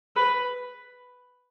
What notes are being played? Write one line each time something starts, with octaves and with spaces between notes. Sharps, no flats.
B4